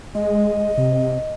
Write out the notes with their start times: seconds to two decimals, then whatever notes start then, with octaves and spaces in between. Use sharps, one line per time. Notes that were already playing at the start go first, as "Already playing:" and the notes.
0.15 G#3 D#5
0.78 C3